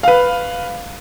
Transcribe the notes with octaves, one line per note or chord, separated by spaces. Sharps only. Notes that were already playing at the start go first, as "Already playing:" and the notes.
B4 F5